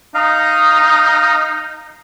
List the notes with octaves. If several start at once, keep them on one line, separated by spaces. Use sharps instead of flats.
D#4 D#5 F5 A#5